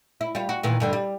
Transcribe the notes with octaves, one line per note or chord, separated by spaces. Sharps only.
E4
G3 F4
F#4
A#2 D#3 E3
G2 D3 G3
G3